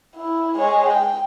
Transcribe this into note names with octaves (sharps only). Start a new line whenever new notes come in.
E4
G#3 C#5
G5